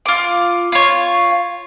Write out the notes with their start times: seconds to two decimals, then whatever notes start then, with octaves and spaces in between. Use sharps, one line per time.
0.06 F4 D6
0.72 F4 C#5